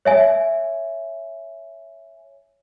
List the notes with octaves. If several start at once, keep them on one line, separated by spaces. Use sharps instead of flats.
C#5 E5 G#5